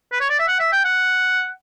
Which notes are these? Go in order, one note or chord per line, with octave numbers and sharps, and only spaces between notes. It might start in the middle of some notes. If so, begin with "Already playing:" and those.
B4
C#5
D5
E5
F#5
E5
G5
F#5